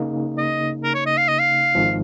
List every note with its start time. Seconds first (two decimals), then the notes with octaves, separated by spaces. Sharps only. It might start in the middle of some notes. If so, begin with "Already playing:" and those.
Already playing: C#3 A#3 D#4
0.38 D#5
0.83 A#4
0.94 C#5
1.06 D#5
1.17 F5
1.28 D#5
1.39 F5
1.75 G#1 G#2 F3